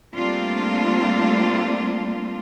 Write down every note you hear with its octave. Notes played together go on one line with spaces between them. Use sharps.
G3 A3 A#3 C4 D4 F4